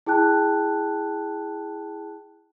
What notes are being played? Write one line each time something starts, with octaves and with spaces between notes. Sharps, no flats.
E4 G#4 G5 A5 F#6